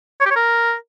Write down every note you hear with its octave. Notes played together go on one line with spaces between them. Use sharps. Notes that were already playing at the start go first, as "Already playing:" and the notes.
C#5
G4
C#5
A#4